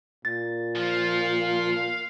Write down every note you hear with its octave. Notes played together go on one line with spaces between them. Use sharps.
A#2 A6
F3 F5